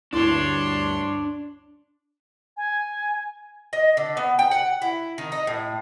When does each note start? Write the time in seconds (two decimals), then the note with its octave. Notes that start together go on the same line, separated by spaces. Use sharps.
0.13 D2 G2 D4 E4 C#5 C6
2.57 G#5
3.73 D#5
3.97 D3
4.17 B3
4.39 G5
4.51 F#5
4.82 E4
5.18 D#3
5.32 D#4
5.47 A2